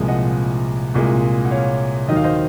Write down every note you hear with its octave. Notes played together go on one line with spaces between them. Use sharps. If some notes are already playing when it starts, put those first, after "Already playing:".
Already playing: C2 A#2 F3 G#3
D#5 F#5
C2 A#2 G#3
F#5
C#5 F5
D#2 D#3 F#3 D#5
F5
C5 D#5